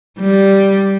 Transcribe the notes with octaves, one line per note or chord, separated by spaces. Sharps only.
G3